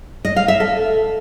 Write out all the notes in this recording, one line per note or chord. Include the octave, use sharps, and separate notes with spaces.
D#5
F5
E5
A4